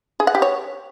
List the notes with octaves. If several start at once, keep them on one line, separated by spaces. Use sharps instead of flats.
G#4
F#5
G4
C#5